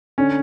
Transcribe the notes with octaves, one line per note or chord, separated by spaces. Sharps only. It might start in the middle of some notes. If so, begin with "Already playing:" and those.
D3 C#4